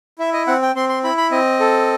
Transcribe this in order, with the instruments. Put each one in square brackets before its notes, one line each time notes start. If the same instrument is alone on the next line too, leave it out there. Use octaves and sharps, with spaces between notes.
[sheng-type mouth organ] E4 E5
D#5
C4 F#5
G5
C4 C6
C6
E4 B5
B5
C4 D#5
A4